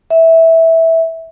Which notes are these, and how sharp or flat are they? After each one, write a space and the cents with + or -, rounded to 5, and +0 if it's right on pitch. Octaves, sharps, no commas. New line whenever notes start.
E5 -10